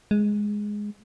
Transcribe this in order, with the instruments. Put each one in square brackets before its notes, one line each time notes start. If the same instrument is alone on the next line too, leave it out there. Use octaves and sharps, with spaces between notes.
[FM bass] G#3